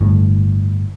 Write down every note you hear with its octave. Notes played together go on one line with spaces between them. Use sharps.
G1 A2